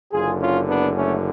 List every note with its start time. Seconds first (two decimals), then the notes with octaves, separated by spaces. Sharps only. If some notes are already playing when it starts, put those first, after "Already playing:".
0.12 F#1 F#2 D3 F4 G#4
0.40 C#4 F4
0.68 B3 D4
0.96 A3 C#4